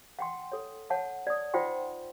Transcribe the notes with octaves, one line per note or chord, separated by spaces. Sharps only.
F#5 G5 C6
A4 C#5
C#5 F#5 A5
D5 D#6
D#4 F4 C5 F#5 G5 C6